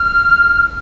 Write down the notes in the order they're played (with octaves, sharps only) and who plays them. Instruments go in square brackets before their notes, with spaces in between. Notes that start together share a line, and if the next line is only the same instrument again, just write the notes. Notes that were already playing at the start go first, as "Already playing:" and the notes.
Already playing: [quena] F6